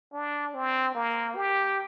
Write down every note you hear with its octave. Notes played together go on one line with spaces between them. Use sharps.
D4
C4
A#3
G4